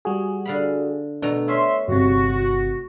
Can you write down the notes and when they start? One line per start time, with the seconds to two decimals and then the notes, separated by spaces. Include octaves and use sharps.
0.05 G3 F#4 G#4
0.45 D3 F5 B5
1.22 B2 A3 D4 A#5
1.48 C#4 E5 C6
1.88 G1 C3 F#4